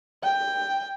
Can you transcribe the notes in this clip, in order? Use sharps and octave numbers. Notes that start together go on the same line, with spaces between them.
G5